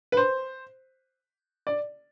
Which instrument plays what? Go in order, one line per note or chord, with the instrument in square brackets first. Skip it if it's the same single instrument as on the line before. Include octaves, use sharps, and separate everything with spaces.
[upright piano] B4
C5
D5